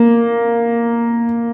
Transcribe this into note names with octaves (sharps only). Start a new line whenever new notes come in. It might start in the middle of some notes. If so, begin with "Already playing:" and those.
Already playing: A#3